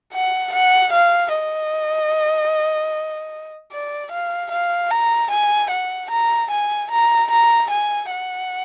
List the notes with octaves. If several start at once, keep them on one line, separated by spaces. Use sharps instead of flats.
F#5
F#5
F5
D#5
D5
F5
F5
A#5
G#5
F#5
A#5
G#5
A#5
A#5
G#5
F#5